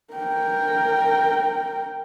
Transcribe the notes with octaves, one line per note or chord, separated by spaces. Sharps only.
A#4 G5